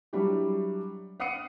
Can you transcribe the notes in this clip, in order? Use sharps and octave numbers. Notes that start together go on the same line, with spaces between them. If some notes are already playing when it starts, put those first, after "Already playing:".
F#3 G3 D4 E4 G4
F5 F#5 D#6 C7 C#7 D#7